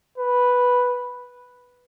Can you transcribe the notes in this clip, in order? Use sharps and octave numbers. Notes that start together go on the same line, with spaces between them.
B4